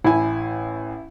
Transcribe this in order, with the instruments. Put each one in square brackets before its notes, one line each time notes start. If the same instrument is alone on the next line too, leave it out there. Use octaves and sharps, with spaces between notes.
[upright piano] A1 G#5 [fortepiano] E4